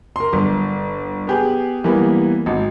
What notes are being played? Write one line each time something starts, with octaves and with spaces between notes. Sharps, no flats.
A#4 C6
G1
B3 G4 G#4
E3 G3 A#3 B3
G#1